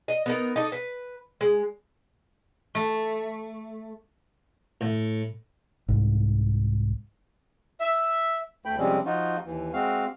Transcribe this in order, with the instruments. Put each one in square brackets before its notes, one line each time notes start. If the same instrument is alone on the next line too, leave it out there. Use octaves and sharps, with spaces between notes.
[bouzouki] D#5
B3 D#4 A#4
D4 D#4 A4
B4
G#3
[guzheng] A3
[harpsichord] A2
[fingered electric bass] C2 G#2
[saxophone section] E5
[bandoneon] D2 A3 G5 B5
C3 F3 G3 G#3 C4 C#4
F3 D#4 F4 F#4
D#2 E3
G#3 C4 F#4 F5